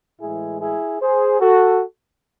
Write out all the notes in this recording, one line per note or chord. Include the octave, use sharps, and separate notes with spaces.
A2 E3 G#3 E4 G#4
E4 G#4
G#4 C5
F#4 A4